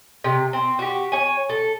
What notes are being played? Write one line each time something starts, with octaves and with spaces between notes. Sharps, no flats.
C3
C4
F#4 G4
C#5 G#5
A4